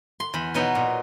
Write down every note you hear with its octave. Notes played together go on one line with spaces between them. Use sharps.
C6
E2 B5
B2 F#3 B3 D#4
A#2